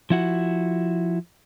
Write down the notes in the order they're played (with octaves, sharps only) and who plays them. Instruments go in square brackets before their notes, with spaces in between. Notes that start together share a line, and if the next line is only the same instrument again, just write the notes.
[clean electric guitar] F3 E4 F#4